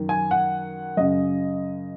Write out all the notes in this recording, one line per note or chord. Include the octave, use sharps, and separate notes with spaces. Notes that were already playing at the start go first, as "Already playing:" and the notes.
Already playing: F#2 D#3
G#5
F#5
F#2 C#3 D#5